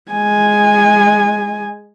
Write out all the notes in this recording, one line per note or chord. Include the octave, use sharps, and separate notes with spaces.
G#3 G#5